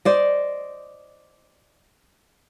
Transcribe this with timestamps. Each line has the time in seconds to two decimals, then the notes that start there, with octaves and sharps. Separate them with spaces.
0.05 C5 D5 D#5